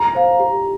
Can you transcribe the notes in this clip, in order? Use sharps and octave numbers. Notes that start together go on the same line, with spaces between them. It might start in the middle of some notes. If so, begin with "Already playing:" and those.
Already playing: A#5
C5 F5
G4